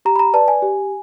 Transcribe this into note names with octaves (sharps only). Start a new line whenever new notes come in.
G4 A#5
B5
A#5
B4 D5 A5
G#5
G4